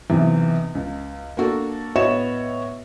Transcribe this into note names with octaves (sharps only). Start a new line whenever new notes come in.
B1 E2 C3 E3
C#2
A#3 D4 F#4 A4
A2 B3 F#4 C#5 D#5 E7